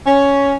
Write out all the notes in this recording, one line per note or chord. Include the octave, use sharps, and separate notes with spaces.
C#4